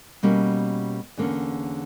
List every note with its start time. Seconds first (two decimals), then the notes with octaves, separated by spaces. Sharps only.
0.23 B2 G3 A#3 C#4
1.17 E2 D3 A#3 C#4